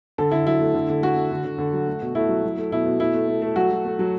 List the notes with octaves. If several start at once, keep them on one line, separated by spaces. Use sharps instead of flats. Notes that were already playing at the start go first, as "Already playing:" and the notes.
D3 A4
D3 E4
F#3 E4
A3
D3
D3
A3 F#4
A3
D3
D3
D3
F#3
A3
B2
A3 E4
F#3
F#3
A3
B2 E4
B2
A3 E4
A3
A3
A3
F#3 F#4
F#3
A3
F#3